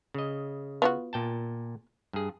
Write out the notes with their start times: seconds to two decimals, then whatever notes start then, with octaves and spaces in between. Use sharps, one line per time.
0.14 C#3 D#5
0.82 B3 F4 F#4
1.13 A#2 G5 A5
2.13 G2 G#4